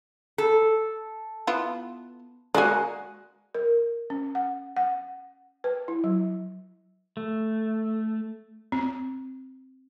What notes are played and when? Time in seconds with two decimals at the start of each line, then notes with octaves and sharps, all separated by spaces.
0.38 A4
1.47 B3 E4 F4
2.55 G#3 A#3 F#4 D5 G#5
3.54 A#4
4.10 C#4
4.35 F#5
4.76 F#5
5.64 B4
5.88 E4
6.04 F#3
7.17 A3
8.72 C4